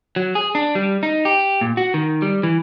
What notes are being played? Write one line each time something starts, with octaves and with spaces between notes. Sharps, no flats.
F#3
G#4
D4
G3
D#4
G4
A#2
F#4
D#3
G3
E3